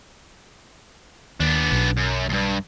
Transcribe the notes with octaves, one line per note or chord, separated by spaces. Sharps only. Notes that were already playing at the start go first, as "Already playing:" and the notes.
D#2 B3 D4
B1
F#2
D2 G2